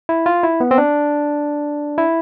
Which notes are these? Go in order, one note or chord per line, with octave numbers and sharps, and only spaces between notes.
E4
F4
E4
B3
C4
D4
E4